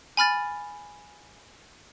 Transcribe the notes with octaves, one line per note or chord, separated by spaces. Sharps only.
G#5 B5 F6 A6